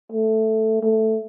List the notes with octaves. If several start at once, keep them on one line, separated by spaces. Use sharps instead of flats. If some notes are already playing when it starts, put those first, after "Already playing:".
A3
A3